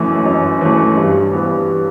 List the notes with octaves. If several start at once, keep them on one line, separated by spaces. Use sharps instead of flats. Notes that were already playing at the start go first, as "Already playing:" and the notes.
Already playing: F#2 E3 A3
F#2
E3 A3
G2
E3 B3